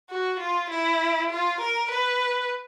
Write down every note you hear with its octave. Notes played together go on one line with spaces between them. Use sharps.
F#4
F4
E4
F4
A#4
B4